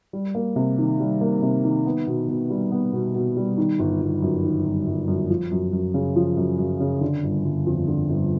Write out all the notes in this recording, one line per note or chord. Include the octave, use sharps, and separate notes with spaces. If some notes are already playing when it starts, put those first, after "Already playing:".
G3
A#3
C3
D#3
G3
A#3
C3
D#3
B3
B2
B2
G3
B3
B2
B2
G3
D#3
G1
G1
F#2
D#3
G1
G1
F#2
F3
F#2
F#2
C#3
F3
F#2
F#2
C#3
D3
G1
G1
F2
D3
G1